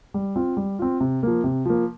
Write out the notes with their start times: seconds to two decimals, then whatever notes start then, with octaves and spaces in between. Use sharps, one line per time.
0.14 G3
0.36 C4 F4
0.57 G3
0.79 C4 F4
1.00 C3
1.23 F3 A#3
1.44 C3
1.65 F3 A#3